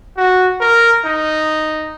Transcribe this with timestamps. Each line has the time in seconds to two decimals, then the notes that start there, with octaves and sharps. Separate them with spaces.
0.17 F#4
0.60 A#4
1.05 D#4